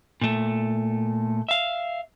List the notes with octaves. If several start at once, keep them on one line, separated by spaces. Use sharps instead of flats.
A#2 A3
E5 F5